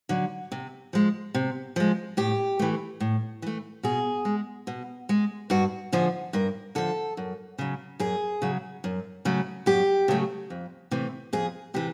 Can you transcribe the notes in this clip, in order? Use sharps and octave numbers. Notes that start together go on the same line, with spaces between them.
D3 F#3
C3
F3 G#3
C3
F3 G#3
A2 G4
E3 A3
A2
E3 A3
B2 G#4
G#3
B2
G#3
G2 F#4
D3 F3 G#4
G2 A#4
D3 F3 A4
F#2
C#3 F#3
F#2 G#4
C#3 F#3
F#2
C#3 F#3 A3
F#2 G4
C#3 F#3 A3
F2
C3 E3 A3
F2 G#4
C3 E3 G4